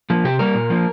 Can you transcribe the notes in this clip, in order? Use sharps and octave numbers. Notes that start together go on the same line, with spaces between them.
F3 A#3
C3 G4
G3 A#3 A#4
A#2
F3 A#3